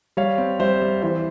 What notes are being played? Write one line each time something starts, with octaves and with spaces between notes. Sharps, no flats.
G3 C#5 F5
C4
G3 C5 E5
G3
E3 C5 E5